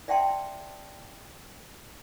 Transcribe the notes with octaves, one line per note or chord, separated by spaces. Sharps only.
D5 E5 F#5 G5 A5 C6